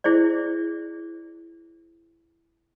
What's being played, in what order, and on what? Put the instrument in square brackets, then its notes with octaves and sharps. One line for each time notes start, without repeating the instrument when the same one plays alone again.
[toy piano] E4 G#4 C5 D5